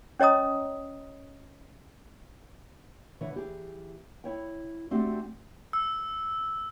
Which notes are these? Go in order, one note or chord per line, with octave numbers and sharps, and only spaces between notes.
C#4 C#5 D#5 A#5 D#6
D3 E3 C#5
E3 G4 G#4
E4 C#5 G5
A3 C4 D4 F#4 G4 G5
E6